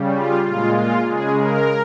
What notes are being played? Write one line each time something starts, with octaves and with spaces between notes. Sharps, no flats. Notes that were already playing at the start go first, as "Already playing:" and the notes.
Already playing: C#3 G3
F4
A#2 G#3 F4
F4
C#3 G#3 G#4
A#4